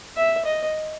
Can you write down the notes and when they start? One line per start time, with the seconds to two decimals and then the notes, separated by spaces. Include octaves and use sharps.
0.17 E5
0.45 D#5